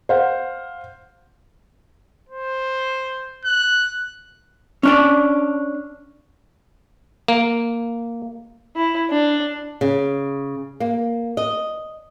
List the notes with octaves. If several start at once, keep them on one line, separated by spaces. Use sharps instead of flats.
C5 F5 F#5
C5
F#6
C#4 D4 D5
A#3
E4
D4
C#3
A#3
D#5